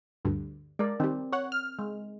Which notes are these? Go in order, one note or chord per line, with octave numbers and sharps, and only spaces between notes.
D2 G2 D3
G#3 A#4 D5
D#3 G3 C4
C#5 F#5
F6
G#3